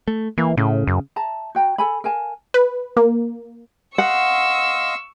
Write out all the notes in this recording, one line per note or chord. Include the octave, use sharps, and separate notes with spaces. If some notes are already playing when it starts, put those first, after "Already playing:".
A3
E3 A#3
A2 C#3
F#2
E5 A5 A#5
F#4 G5 A#5
A4 G#5 B5
A#4 F5 G#5 A5
B4
A#3
D#5 F5 F#5 C6 C#6 E6